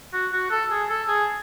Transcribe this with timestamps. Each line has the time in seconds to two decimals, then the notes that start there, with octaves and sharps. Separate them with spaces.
0.13 F#4
0.32 F#4
0.51 A4
0.71 G#4
0.89 A4
1.08 G#4